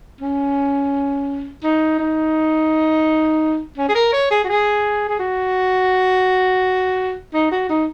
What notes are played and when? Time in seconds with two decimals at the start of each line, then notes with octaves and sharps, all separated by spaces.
0.21 C#4
1.63 D#4
1.99 D#4
3.77 C#4
3.89 G#4
3.95 A#4
4.13 C#5
4.30 G#4
4.44 F#4
4.48 G#4
5.09 G#4
5.19 F#4
7.33 D#4
7.51 F#4
7.69 D#4